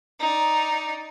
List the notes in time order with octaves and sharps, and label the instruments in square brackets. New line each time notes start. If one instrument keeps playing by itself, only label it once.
[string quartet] D#4 D5